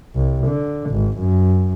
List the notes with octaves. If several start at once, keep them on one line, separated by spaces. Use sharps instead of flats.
C2
D3
G#1
F#2